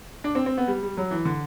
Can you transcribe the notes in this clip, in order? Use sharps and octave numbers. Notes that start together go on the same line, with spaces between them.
D4
C4
C4
B3
G3
G3
F#3
E3
D3